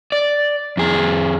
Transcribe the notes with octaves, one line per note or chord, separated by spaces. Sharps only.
D5
F2 G#4